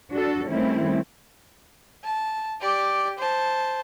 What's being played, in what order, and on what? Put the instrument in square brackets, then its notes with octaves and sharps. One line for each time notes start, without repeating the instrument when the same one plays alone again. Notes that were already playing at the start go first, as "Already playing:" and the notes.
[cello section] D4 F#4 A4
D#3 G3 A3 C4 C#4 E4
[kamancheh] A5
G4 D5
C5 A5